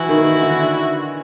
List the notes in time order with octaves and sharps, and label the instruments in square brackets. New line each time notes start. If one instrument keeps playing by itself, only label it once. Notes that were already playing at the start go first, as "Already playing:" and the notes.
Already playing: [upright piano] E3 [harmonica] E4 F#4
[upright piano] D#3
D3